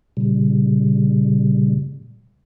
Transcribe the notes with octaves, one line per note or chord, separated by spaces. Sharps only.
A#2 C#3 G3